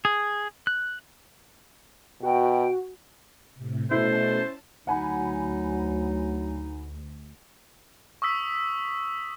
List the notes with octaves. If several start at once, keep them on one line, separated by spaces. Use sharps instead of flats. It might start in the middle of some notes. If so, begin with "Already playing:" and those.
G#4
F#6
B2 F#4 G5
A2 C3
B2 A3 C#4 E4 C5 A5
D2 F#3 D#4 F#5 G#5 B5
C#6 D#6 E6 B6